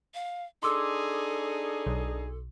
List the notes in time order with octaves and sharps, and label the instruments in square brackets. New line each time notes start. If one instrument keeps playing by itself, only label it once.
[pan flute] F5
[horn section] D4 D#4 G#4 [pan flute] A4 [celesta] C6 D6 E6
[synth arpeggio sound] B1